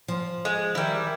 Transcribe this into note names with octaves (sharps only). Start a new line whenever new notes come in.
F3
G#3
D#3 G3 E4